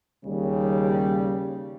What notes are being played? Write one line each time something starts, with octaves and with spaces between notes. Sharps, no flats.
D#2 C#3 G3